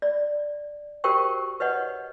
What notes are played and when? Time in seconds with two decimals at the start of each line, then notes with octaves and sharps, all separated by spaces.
0.02 D5
1.04 F#4 G4 A#4 C5 G5 C#6
1.60 B4 C#5 D#5 F#5